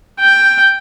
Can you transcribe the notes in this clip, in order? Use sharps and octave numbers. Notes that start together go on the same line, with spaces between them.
G5